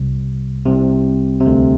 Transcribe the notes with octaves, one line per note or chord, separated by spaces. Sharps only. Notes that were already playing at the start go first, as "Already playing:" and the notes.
Already playing: C2 C3
C2 C3
C3
D2 D3